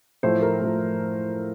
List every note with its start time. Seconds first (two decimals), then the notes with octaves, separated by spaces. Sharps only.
0.23 A2 F3 A3 C5
0.42 A#4
0.62 A2 F3 A3